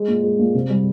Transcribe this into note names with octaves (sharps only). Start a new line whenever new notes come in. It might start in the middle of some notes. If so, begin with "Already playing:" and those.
Already playing: G#3
A#2
G#3
A#2
C3
G3